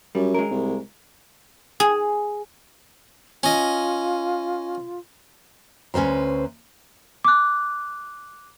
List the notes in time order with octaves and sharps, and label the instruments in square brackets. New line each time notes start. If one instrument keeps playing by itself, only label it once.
[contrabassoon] F#2 [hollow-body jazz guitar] G3
[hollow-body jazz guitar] G#3 A#4
[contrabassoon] C2
[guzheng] G#4
[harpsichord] C#4 D#5 [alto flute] F4
[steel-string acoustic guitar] D2 C#4 B4 C5 A#5
[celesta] D6 F#6